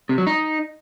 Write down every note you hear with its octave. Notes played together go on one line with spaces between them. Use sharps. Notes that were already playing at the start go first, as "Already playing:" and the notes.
C3
F#3
D#4